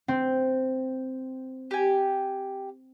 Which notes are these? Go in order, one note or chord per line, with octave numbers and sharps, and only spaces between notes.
C4
G4 G#5